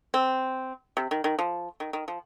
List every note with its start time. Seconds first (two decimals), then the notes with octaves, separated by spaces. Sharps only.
0.14 C4
0.97 C3
1.11 D#3
1.24 D#3
1.39 F3
1.80 D#3
1.93 D#3
2.08 F3